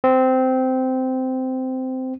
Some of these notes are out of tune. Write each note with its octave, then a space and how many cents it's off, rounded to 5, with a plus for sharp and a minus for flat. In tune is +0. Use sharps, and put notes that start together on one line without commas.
C4 -15